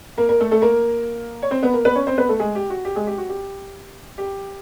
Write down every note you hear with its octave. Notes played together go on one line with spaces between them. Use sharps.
A#3 A#4
A#3 A#4
A3 A4
A3 A4
A#3 A#4
C#5
C4 C5
B3 B4
A#3 A#4
B3 B4
C#4 C#5
C4 C5
B3 B4
A3 A4
G#3 G#4
G4
F#4
G4
G#3 G#4
G4
F#4
G4
G4